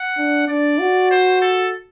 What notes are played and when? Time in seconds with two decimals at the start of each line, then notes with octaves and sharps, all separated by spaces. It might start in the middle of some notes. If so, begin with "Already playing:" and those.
Already playing: F#5
0.17 D4
0.48 D4 D5
0.80 F#4
1.11 C5
1.42 A4